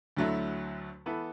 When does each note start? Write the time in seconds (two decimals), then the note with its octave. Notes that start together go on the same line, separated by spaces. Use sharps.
0.17 D2 D3 F#3 A3 E4
1.06 E3 B3 E4 A4